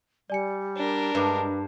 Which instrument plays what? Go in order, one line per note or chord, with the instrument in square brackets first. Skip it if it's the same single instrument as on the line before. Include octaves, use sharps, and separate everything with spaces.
[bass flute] G3 [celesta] D5 G#5 C#7
[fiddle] D4 A#4
[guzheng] G2 [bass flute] G#3 [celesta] B4 D6